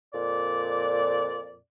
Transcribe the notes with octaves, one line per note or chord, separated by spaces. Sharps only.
F2 A#2 D5